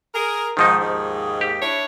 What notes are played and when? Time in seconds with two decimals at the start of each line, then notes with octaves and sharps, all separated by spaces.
0.15 G#4 A#4
0.57 G#2 D#3 F3 D#4
0.81 D#2 G#2
1.41 G4
1.62 D4 E4 C#5